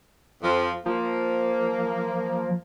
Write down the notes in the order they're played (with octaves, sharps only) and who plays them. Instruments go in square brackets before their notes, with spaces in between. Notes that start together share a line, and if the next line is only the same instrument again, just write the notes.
[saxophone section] F2 F3
[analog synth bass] F3 [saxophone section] A#3